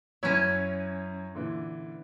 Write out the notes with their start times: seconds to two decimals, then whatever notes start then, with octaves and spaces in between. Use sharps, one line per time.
0.23 F#2 C#4 E4 C#5
1.35 A#2 D3 E3